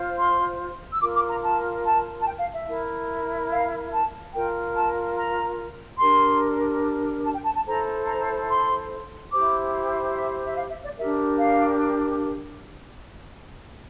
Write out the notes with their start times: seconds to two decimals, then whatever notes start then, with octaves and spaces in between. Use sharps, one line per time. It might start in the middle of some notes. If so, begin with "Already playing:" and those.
Already playing: F4 C5
0.18 C6
0.93 E6
1.01 F4 A#4 D6
1.15 D6
1.29 A#5
1.43 A5
1.85 A5
2.20 A5
2.25 G5
2.39 F5
2.54 E5
2.67 E4 A#4
3.51 F5
3.92 A5
4.33 F4 A#4 G5
4.75 A5
5.17 A#5
5.99 D4 G4 A#4 C6
7.24 A5
7.34 G5
7.45 A5
7.55 A5
7.66 E4 A4 C5 A#5
8.07 A#5
8.49 C6
9.32 E4 G4 C5 D6
10.15 E5
10.46 E5
10.56 F5
10.70 E5
10.84 D5
10.98 D4 G4 A#4 E5
11.39 F5